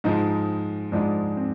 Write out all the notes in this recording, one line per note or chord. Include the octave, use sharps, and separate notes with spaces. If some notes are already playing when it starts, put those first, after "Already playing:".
G#2 F3 G#3 D#4
G#2 F3 G#3 D4
C4